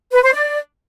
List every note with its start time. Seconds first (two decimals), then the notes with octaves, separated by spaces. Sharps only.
0.12 B4
0.22 C5
0.32 D5